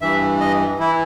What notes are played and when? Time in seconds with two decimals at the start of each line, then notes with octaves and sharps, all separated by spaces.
0.01 G2 E3 E5
0.41 D#5
0.79 E3 E4